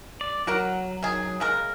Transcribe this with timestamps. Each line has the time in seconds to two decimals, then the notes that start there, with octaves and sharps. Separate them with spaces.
0.21 D5
0.47 F#3 F#4 A#4 F#5
1.03 D#3 G#4
1.40 C#3 G#3 A#4